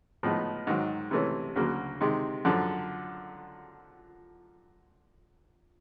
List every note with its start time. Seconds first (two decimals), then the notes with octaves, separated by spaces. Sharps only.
0.23 A2 F3 G#3 B3 D#4
0.67 G#2 D#3 F#3
1.11 C3 E3 A3 C#4
1.56 D2 C#3 F#3 A#3
2.01 C3 D#3 G#3
2.45 F#2 D3 F3